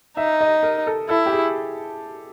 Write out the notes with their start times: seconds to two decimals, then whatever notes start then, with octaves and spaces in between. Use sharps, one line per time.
0.17 D#4 E5
0.41 D#5
0.63 A#4
0.87 A4
1.09 E4 A4
1.26 G4
1.33 G#4